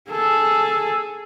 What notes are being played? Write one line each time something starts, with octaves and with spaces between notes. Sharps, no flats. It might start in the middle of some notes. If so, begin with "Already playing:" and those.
G#4 A4